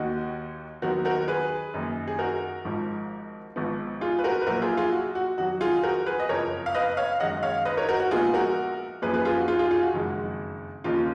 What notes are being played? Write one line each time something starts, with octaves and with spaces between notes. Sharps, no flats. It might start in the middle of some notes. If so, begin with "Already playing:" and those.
Already playing: D#2 D#3 A#3 D#4 F#4
D#2 D#3 F#3 B3 F#4 A#4
F#4 A#4
G#4 B4
F#2 D#3 A#3
G#4
F#4 A#4
G#1 G#2 F3
G#1 G#2 F3 B3
F4 G#4
B4
F#4 A#4
B4
A#1 A#2 F#3 A#3 F#4 A#4
F4 G#4
F4 G#4
F#4
F#4
F2 D#3 F#3 F#4
F4 G#4
F#4 A#4
G#4 B4
D#5
F#1 F2 F3 A#4 C#5
F5
B4 D#5
C#5 F5
F#2 D#3 G#3 D#4 D#5 F#5
C#5 F5
B4 D#5
A#4 C#5
F#4 A#4
F#4
A#1 A#2 G#3 B3 D#4 F4 G#4
F#4 A#4
F#2 F3 A#3 C#4 G#4 B4
G#4 B4
F4 G#4
F#4
F4 G#4
F4 G#4
F4 G#4
F#4
F#1 F2 D#3 G#3
D#2 C#3 F3 A#3 D#4 F4